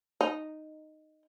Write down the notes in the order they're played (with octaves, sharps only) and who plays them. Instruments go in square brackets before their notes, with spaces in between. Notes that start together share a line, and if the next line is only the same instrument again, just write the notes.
[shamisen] D#4